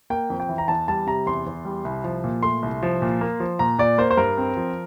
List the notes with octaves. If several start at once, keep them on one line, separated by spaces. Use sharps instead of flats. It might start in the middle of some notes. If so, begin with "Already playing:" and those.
A#3 G5
F2
G5
E3
A#5
E2 A5
G3 A5
C3 A#5
E2 C6
E2
G3
C2
F3
A#2
A3 C6
C2
F3
A#2
A#3
F3
A#2 A#5
A#2 D5
A#3 C5
C5
G2 A#4
C4
F3